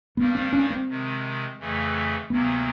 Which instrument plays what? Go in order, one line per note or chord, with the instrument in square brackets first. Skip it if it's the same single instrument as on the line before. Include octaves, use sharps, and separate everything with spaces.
[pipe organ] G2 D#3 G3 A#3 D4 [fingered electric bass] B3
[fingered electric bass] C4
C#4
C4
[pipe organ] C3 D#3 G#3
F2 C#3 E3 A3
[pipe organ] D2 C3 D#3 F#3 A#3 [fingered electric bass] B3